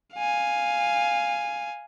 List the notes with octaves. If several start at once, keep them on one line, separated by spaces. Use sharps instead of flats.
F5 G#5